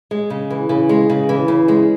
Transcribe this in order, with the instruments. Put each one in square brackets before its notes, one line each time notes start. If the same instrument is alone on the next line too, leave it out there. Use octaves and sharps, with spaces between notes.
[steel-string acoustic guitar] G#3
C#3
E3
C#3
G#3
C#3
E3
C#3
G#3